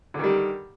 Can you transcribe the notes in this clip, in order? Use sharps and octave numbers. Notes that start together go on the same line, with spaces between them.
D3 D#3 G3